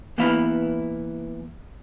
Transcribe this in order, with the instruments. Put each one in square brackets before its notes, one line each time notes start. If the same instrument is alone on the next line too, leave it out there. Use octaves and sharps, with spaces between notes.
[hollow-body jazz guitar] E3 A#3 B3 E4 F5 B5